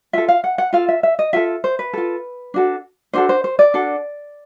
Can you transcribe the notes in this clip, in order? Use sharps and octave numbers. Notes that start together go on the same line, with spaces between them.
F4 A4 E5
F5
F#5
F#5
F4 A4 F5
E5
E5
D#5
F4 A4 E5
C5
B4
F4 A4
D4 F#4 A4
D4 F#4 A4 C5
C5
C5
D5
D4 F#4 A4